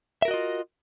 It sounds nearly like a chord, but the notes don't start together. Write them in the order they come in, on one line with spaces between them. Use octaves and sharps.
E5 A#4 F#4 D#5 F4